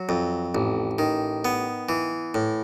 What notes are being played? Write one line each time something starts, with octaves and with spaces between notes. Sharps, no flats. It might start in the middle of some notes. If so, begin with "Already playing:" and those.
Already playing: F#3
F2
A1
D#3
B3
E3
A2